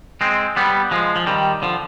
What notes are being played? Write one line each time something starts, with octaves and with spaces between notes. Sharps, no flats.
G#3 C4
G3 B3
F3 G#3
F3
D#3 G3
D3 F3